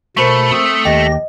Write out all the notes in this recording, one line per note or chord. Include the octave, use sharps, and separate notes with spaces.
B2 A3 A#4 C5 A5 B5 C#6
C4 D#6 E6
D#2 G4 D#5 G5 A#6